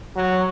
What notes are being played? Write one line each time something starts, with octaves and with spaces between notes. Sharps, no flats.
F#3